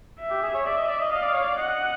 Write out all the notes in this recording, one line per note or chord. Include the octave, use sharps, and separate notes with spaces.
E5
G4
G#4
C#5
D5 E5
D#5
D5
D#5
D#5 F5
D5
C#5
D5
D#5 F#5